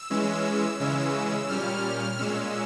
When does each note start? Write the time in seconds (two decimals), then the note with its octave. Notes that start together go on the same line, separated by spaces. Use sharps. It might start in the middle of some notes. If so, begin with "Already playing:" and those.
Already playing: E6
0.10 E3 G#3 C#4
0.80 C#3 E3 G#3 C#4 E6
1.49 A#2 G3 C#4 F6
2.18 A#2 G#3 C#4 E6